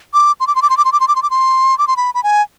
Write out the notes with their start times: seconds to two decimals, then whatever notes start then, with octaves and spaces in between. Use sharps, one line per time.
0.14 D6
0.40 C6
0.47 D6
0.55 C6
0.62 D6
0.70 C6
0.77 D6
0.85 C6
0.92 D6
1.00 C6
1.08 D6
1.16 C6
1.23 D6
1.30 C6
1.78 D6
1.88 C6
1.97 B5
2.14 B5
2.23 G#5